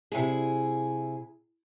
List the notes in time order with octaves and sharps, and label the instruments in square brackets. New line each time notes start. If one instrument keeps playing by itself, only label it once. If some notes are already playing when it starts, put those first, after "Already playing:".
[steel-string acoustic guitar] C3 E4 G#4